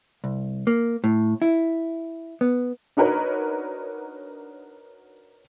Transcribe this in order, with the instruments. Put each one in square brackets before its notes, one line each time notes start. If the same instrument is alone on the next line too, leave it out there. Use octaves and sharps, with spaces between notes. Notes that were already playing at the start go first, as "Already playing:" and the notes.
[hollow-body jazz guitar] C2
A#3
A2
E4
B3
[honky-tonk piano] D4 D#4 F#4 A#4 B4 C#5